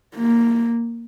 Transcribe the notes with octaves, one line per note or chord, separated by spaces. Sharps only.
A#3